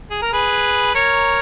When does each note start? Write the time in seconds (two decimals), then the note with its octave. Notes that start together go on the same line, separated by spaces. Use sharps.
0.11 G#4
0.22 A#4
0.33 G#4 B4
0.95 A#4 C#5